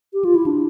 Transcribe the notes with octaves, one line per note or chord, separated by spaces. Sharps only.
G4
F4
E4
D4